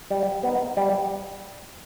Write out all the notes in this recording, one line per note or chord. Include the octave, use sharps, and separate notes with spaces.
G3
B3 D#4
G3